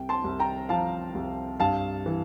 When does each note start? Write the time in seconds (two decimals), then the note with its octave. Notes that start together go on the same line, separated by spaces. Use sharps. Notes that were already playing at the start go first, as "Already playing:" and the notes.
Already playing: C2 G5
0.09 A5 C6
0.24 C2
0.39 G5 A#5
0.69 F3 F5 A5
1.15 C2
1.60 G2 F5 A5
2.06 E3